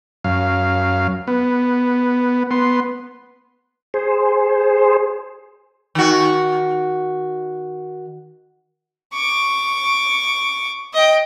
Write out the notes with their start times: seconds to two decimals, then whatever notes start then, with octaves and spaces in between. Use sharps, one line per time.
0.24 F#2 F5
1.27 B3
2.51 B3 C6
3.94 G#4 C5
5.95 D#3 F#4
9.14 C#6 D6
10.94 D#5 G5